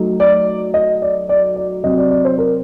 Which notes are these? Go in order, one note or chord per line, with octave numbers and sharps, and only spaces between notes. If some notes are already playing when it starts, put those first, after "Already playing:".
Already playing: F#3 A3 D#4
D5
D#5
D5
D5
D5
C3 F#3 C4 D#5
D5
D5
C5
A#4